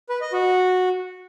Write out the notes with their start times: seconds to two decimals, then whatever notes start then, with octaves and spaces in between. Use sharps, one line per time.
0.09 B4
0.21 D#5
0.33 F#4